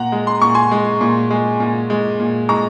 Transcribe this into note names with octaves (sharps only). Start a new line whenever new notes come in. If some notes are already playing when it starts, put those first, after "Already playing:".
Already playing: A#2 F#5 A#5
G#3
C6
A#2 C#6
G#5 C6
G#3
A#2
G#3
A#2
G#3
A#2
G#3 A#5 C#6